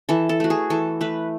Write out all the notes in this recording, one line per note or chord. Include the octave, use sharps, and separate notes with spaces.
E3 A4
A4
A3 F#4
G#4
E3 A4
A3 B4